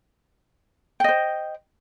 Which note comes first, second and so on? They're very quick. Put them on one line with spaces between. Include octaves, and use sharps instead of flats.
G5 D#5 C5